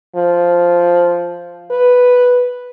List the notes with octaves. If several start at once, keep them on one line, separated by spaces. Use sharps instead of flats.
F3
B4